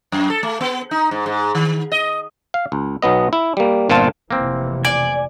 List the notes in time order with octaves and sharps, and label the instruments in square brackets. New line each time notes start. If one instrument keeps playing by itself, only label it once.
[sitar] F#2
A4
A3
B3
D#4
G#2
G#2
D#3
D#5
[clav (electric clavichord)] F5
C#2
B1 F#3 B3 D#5
E4
G3 A#3
G1 A#2 C4 F4 A5
[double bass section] F1 C3 E3 [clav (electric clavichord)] A#3 C4
[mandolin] D5 [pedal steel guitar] G#5